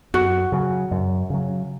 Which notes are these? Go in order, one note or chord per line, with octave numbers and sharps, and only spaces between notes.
F#2 F#4
C#3 F#3
F#2
C#3 F#3